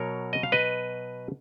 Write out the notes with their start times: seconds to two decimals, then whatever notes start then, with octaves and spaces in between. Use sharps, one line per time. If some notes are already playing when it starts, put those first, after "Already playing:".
Already playing: B2 F#3 A#4 C#5
0.33 D#5
0.43 F5
0.52 B4 D#5